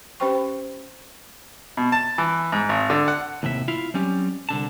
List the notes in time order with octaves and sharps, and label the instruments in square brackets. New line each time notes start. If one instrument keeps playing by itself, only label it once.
[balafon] C#4 G4 B4 C5 G5 C#6
[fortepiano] B2
A5
E3
G#2
G#1
D3
F#5
[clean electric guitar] D#2 A2 C3 E5
E4 F4 E5 F5
F#3 G3 C4 C#4 G4
C2 D3 A5